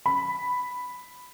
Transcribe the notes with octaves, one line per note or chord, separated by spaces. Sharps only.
B5